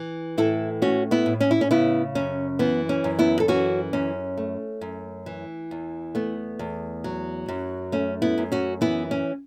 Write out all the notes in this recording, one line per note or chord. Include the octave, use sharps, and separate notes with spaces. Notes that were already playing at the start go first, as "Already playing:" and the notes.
Already playing: E3
A2 E4 A4
A3 C#4 F#4
B3 E4
A2
C#4
E4
C#4
C#3 B3 E4
F#2 C#4
E3 B3
C#4
F#2
B3 E4
A4
E3 C#4 F#4
F#2 C#4
A3
F#2
E3
E2
A3 B3
E2
F#3
F#2
A3 C#4
B3 E4
F#2
C#4 F#4
E3 B3 E4
C#4